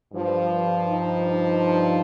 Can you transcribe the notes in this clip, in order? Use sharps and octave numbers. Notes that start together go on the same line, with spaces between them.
G2 F3
D#4
D#4